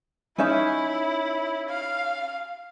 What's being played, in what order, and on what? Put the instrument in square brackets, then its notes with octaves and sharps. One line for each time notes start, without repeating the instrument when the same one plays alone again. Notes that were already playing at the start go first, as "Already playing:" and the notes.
[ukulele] C#4 D#4 E5 [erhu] E4
[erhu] F5